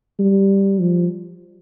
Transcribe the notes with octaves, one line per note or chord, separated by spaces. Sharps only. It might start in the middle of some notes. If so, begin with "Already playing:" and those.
G3
F3